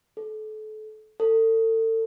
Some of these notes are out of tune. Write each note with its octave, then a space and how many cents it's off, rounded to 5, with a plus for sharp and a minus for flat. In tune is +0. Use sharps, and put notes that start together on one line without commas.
A4 -30
A4 +35